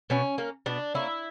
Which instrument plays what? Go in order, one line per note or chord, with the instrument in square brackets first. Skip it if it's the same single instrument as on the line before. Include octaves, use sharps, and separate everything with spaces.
[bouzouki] B2 C#4
A#3 C#4
B2 D4
A#3 C#4 E4